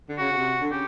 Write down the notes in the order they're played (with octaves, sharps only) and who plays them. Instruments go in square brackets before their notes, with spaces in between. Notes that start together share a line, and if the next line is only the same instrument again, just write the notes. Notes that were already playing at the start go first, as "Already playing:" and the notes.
[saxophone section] D3
[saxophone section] C#3 [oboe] F#4
[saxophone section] C#3
C3
D3
[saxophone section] C#3 [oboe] G4